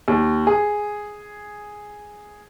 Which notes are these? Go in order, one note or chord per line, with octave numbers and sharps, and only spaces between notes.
D#2
G#4